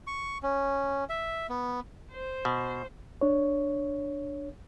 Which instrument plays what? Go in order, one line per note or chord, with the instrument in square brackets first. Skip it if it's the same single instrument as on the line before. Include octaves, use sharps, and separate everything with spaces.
[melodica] C#6
C#4
E5
B3
[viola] C5
[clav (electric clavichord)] B2
[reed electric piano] D4 C#5